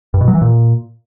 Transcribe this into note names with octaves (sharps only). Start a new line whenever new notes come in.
G2
B2
F#3
E3
A#2